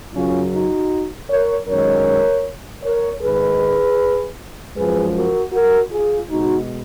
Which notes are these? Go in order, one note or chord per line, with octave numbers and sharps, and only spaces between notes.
F#2 C#3 F#3 C#4 F4
D#4 F#4
A#4 C#5
F#2 D#3 G#3 A#4 C#5
A#4 C#5
G#2 D#3 G#3 G#4 B4
F#2 F3 G#3 G#4 B4
F#4 A#4
F#4 A#4
F4 G#4
B2 G#3 D#4 F#4